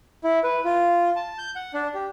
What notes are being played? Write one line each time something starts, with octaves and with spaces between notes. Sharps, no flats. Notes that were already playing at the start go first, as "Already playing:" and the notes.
E4
B4
F4
A5
G6
F#5
D4
G4